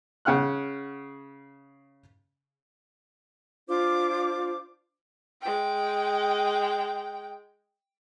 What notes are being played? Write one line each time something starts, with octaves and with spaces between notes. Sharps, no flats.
C#3 F#5 F6 F#6
D4 F4 C5 D6
G#3 G5